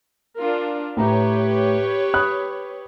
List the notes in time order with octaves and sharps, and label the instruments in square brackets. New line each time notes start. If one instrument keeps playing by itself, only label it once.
[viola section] D4 F4 A#4
[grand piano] A2 A#5 [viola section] G4 B4 C#5
[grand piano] B5 D#6 F#6